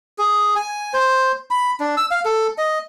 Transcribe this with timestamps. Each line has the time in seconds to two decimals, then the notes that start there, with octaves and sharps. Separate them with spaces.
0.18 G#4
0.56 G#5
0.93 C5
1.51 B5
1.80 D4
1.97 E6
2.11 F5
2.25 A4
2.58 D#5